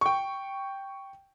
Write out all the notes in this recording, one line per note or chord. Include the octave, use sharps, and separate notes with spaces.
G5 C#6